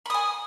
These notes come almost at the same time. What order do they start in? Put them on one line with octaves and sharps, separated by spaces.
B5 D#6 G#5